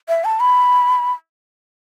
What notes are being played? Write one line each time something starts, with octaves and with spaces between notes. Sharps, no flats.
E5
A5
B5